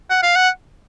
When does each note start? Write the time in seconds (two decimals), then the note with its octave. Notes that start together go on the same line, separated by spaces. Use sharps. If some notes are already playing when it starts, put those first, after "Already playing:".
0.10 F#5
0.23 F5
0.36 F#5